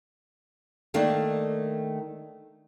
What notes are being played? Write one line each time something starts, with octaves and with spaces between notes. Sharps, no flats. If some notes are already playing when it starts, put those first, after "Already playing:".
D#3 A3 A#3 D4